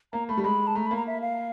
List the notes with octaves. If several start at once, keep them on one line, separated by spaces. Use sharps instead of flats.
A#3 A#5
A3 B5
G3
G#3 B5
A5
A3 A#5
B5
A#3
A#5
E5
F5